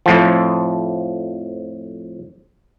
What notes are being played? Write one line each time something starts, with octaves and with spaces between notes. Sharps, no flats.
F2 A2 F3